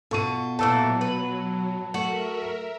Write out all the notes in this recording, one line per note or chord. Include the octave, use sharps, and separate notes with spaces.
B2 F4 A4 C#6 D#7
A#2 E3 F#3 A3 A5 E6
B4
A3 F#4 A#4 E5